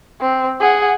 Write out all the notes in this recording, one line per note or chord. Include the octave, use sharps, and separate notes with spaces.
C4
G#4 F#5